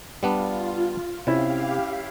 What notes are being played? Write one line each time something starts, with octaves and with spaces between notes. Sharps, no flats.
G3 B3 D4 F4
C3 C#4 E4 G4 F5